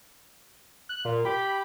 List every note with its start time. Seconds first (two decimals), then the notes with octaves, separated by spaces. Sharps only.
0.89 F#6
1.05 A#2 F4
1.25 G4 B5